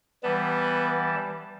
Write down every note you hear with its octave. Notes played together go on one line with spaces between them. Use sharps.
E3 G3 B3 A5